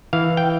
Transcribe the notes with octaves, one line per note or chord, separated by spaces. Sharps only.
E3 F5
G5